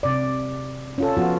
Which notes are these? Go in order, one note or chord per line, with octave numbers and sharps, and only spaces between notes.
C3 D5
C#4 F4 A4
F3 B3 F4 F#4